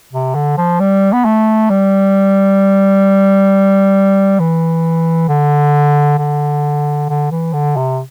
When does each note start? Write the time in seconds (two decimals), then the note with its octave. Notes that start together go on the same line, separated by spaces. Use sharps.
0.13 C3
0.35 D3
0.58 F3
0.80 G3
1.13 B3
1.25 A3
1.70 G3
4.40 E3
5.29 D3
6.18 D3
7.09 D3
7.31 E3
7.53 D3
7.77 C3